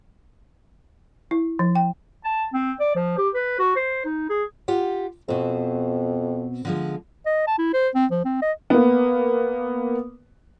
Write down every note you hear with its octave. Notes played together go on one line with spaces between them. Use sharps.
E4
F3
G5
A5
C4
D5
F3
G4
B4
F#4
C5
D#4
G#4
F4 G4 F#5
F2 B2 C4
D3 F3 G#3
D#5
A5
E4
C5
C4
F3
C4
D#5
A#3 B3